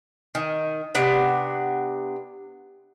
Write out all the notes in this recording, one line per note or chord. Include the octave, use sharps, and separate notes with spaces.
D#3
C3 B3 D4 F#5